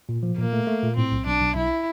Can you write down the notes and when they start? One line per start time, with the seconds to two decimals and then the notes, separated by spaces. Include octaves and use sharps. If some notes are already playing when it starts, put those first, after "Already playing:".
0.09 A#2
0.23 F3
0.38 A#2 A#3
0.53 A3
0.67 A3
0.83 A#2
0.97 A2 C4
1.12 B1
1.26 B1 D4
1.42 B1
1.55 B1 E4